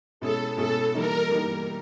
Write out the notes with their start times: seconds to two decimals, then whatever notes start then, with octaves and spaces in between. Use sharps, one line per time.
0.20 B2 G#3 C#4 E4 G#4 A4
0.57 B2 G#3 C#4 E4 G#4 A4
0.95 E3 G3 A#3 D#4 A#4
1.31 E3 G3 A#3 D#4